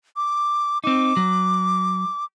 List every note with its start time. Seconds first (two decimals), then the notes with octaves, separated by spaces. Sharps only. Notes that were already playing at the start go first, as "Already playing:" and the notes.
0.16 D6
0.84 C4 D#4 D6
1.17 F#3